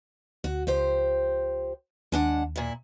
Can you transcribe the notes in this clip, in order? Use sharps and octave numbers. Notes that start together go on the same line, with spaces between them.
D2 F#4
C#2 F3 G4 C5
D#2 G#3 D4 F#5
A#2 E4